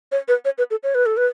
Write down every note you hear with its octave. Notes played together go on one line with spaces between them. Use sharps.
C#5
B4
C#5
B4
A4
C#5
B4
A4
B4